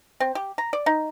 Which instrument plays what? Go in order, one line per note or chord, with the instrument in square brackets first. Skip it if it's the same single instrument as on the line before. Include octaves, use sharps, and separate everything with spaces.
[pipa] C4
G4
A#5
D5
D#4